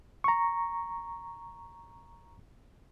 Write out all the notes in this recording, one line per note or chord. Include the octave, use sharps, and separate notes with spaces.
A#5 C#6